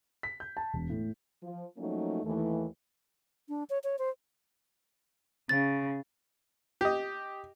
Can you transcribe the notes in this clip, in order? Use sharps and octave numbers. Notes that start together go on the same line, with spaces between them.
B6
G6
A5
E1
A2
F3
F3 F#3 A3 A#3 C#4 D#4
D#2 E3 A3
D4
C#5
C#5
C5
C#3 A6
G4 D#5